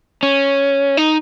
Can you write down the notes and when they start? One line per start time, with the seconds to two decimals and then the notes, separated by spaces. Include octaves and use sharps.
0.23 C#4
0.97 D#4